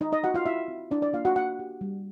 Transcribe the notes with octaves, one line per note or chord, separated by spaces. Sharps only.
D#4 F4 D#5
D#4 D#5
F4 F#4 F#5
F4 F5
E4 F#4 E5
C4
D4 E4 D5
D4 D5
A#3 F4 F5
F#4 F#5
A#3 F#4 F#5
G4
G3